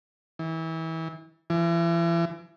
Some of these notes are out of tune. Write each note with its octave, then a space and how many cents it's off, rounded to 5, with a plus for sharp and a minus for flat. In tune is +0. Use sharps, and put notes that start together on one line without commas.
E3 -30
E3 +35